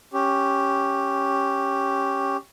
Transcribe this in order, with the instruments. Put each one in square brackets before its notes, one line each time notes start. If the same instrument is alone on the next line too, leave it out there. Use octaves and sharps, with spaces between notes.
[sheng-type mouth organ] C#4 G4